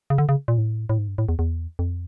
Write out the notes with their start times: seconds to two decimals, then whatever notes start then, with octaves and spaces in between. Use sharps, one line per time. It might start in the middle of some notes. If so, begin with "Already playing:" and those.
0.10 C#3
0.18 D3
0.29 C#3
0.48 A#2
0.58 A2
0.89 A2
0.98 G#2
1.08 G2
1.18 A2
1.29 E2
1.39 E2
1.79 F2